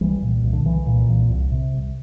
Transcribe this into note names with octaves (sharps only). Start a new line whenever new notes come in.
C2 E3 G3
A#2
C2
D3
C2 E3
A#2
C2
C2
C3
C2